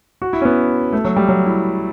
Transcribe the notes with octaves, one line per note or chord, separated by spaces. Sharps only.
F#4
E4
C#4
B3
A3
F#3
G3
F#3
E4